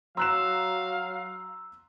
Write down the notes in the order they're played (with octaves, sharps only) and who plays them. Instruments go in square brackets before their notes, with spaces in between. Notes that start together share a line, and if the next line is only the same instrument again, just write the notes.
[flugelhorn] F#3 [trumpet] F5 [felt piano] A#5 F#6 E7 [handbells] C6 E6